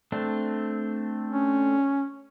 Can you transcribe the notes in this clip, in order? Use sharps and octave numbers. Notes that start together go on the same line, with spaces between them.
A3 C4 D4
C#4